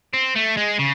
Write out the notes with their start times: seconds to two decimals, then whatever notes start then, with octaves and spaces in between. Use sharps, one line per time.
0.14 C4
0.36 A3
0.57 G#3
0.79 C#3